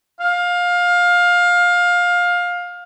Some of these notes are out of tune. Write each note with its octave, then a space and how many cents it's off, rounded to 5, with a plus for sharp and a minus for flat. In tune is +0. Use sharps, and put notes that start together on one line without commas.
F5 +20